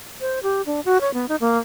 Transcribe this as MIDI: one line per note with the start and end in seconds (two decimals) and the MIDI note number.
0.21 0.39 72
0.43 0.62 67
0.66 0.80 62
0.85 1.00 66
1.01 1.13 73
1.14 1.26 59
1.29 1.36 63
1.40 1.58 58